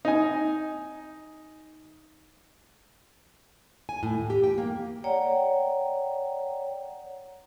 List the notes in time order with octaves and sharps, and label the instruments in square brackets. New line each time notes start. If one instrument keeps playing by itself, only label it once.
[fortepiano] D#4 G#5
[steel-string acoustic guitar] G#5
A2
D#2
G4
G5
A#3
[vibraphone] C#5 D5 F#5 G5 A#5